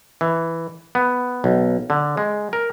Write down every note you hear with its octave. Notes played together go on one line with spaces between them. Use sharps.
E3
B3
B1
D3
G#3
A#4